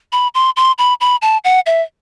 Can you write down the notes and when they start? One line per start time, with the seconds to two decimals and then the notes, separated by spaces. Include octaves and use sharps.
0.12 B5
0.35 C6
0.56 C6
0.78 B5
1.01 B5
1.22 A5
1.44 F#5
1.66 E5